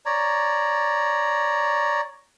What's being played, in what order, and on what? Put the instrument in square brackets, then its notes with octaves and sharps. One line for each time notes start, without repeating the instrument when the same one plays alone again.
[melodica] C#5 D5 A#5